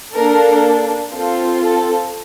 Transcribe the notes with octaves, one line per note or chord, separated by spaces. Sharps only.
A#3 D4 A4 A#4
C4 F4 A4
A4